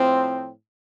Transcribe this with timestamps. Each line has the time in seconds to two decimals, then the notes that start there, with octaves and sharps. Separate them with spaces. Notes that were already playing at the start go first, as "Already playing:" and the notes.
Already playing: A2 F3 C4